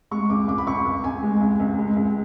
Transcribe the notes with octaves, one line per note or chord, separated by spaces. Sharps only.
G#3 C#6
C#2 D6
C#2 D6
B5
C#2 C#6
C#2
C#2 G#5
G#3
C#2
C#2
G#3
C#2